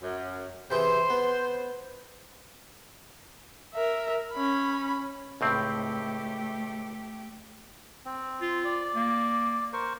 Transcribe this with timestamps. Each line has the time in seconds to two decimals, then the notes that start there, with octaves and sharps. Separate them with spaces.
0.02 F#2
0.71 C3 E3 G#4 C5
1.10 B3
3.74 A#4 E5
4.32 C#4 B5
5.41 C#2 A2 A3 C4 G4
8.05 C4
8.41 F4
8.64 D5
8.95 A#3
9.73 A#4 C5 C#6